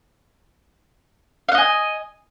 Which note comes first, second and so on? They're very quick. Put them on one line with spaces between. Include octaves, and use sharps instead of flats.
F5 F#5 D#5 G#5